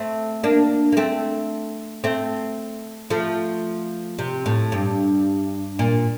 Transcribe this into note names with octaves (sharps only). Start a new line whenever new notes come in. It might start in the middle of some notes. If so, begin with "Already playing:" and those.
Already playing: A3 C4
A#3 D4
A#3
A3 C4
A3 C4
F3 A3
C3
A2
G2
A#2